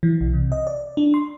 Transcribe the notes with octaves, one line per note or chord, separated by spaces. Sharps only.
E3
B1
C3
D#5
D5
D4
C6